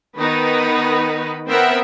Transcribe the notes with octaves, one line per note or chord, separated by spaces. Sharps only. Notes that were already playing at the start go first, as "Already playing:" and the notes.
D#3 B3 D#4 B4
B3 C4 A#4 E5 F#5